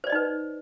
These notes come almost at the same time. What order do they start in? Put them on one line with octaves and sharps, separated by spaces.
C5 D5 D#5 D#4 B4